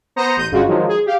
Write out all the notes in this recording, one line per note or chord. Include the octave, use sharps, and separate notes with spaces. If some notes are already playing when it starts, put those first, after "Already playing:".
B3 C5 A#5 D#6 A#6 C#7
A1 G6 D#7
G1 G2 C#3 G#3 F4 F#4
D#3 F3 F#3 G#3
G#4
G4 F5